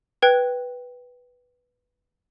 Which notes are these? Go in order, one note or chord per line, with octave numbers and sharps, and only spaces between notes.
B4 G5 F#6 G#6